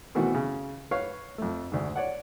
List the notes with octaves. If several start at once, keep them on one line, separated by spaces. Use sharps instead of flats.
B2 D#3 E3 A3 C4 F#4
C#3
B4 C#5 F5 C#6
F2 A3
D2 G#2
C#5 D5 F#5